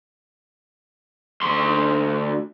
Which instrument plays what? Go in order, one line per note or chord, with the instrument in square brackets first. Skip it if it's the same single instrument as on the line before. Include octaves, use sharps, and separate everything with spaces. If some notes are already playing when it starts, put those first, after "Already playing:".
[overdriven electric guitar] D2 C6